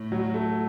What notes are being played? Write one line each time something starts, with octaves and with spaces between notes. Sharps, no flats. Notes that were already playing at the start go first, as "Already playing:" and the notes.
Already playing: A2
F#3
A3